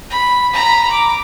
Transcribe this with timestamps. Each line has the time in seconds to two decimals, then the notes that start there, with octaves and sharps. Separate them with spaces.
0.10 B5
0.53 A#5 B5
0.90 D6